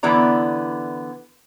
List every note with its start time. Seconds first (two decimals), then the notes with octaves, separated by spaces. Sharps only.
0.03 D3 E3 B3 E4 D5 A#5